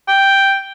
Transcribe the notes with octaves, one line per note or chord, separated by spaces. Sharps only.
G5